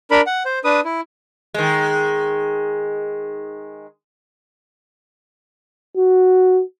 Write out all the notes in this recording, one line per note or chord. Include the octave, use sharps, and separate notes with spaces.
D4 A#4 B5
F#5
C5
D4 B4 D#6
E4
D#3 G#3
F#4